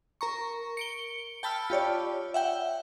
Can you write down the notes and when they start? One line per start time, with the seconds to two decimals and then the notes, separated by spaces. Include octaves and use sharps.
0.21 A#4 A#5 C#6
0.77 C#7 D7 G7
1.43 G5 A5 B5 E6 F6
1.70 F4 G4 C#5 D5
2.34 E5 F#5 G5